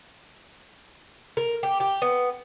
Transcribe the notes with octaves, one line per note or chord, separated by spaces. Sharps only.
A#4
G4
G4
B3